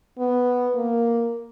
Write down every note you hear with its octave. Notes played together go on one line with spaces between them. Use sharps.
B3
A#3